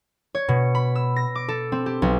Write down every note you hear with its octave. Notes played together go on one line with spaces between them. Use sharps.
C#5
B2
B5
E6
A#6
D6
A4
C4
G4
B1